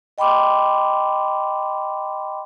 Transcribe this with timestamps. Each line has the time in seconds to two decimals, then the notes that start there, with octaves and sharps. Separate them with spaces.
0.18 D#5 G5 B5 C6 D6